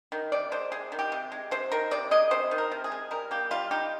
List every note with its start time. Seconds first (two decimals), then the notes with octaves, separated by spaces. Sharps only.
0.12 D#3
0.32 C3 D5
0.52 G#3 C5
0.72 C3 G#4
0.92 D#3
0.99 G4
1.12 C3
1.32 G#3
1.51 C3 C5
1.71 D#3 A#4
1.91 C3 D5
2.11 G#3 D#5
2.31 C3 C5
2.51 D#3
2.58 A#4
2.71 C3
2.84 G#4
2.92 G#3
3.11 G3 A#4
3.31 A#3 G4
3.51 G3 F4
3.71 D#4 G4